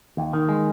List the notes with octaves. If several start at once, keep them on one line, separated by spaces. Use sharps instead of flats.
D#2
D#3
G#3